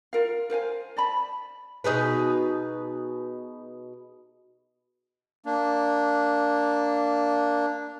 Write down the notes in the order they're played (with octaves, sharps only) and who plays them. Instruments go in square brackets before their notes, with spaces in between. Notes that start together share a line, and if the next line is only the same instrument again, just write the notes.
[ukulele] F4 A#4 F5
A#4 C5 F5 G#5
D5 A5 B5
[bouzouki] B2 D#4 G#4 B4
[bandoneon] A#3 D4